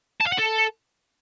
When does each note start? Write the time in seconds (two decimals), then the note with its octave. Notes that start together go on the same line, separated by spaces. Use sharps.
0.21 A5
0.27 F5
0.32 F#5
0.38 A4